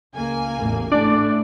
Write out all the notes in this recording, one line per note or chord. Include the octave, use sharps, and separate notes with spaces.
C#2 A#3 G#5
A1 E2
A2 A3 D4 D5